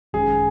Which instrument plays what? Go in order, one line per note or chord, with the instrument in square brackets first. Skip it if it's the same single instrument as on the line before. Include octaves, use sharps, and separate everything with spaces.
[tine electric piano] G#1 F#2 D#3 G#3 C#4 [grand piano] G#4